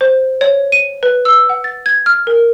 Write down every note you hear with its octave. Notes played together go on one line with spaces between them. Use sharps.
C5
C#5
D#7
B4
E6
F#5
A6
G#6
F6
A#4